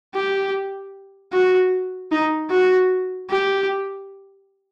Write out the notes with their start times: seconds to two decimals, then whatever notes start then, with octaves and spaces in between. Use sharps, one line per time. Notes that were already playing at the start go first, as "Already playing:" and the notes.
0.15 G4
1.33 F#4
2.11 D#4
2.51 F#4
3.29 G4